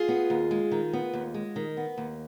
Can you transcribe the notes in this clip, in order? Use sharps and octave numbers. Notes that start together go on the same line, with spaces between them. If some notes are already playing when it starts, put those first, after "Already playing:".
Already playing: F4 G#4
B3
D#2
G#3
D#3
B3
D#2
G#3
D#3
B3
D#2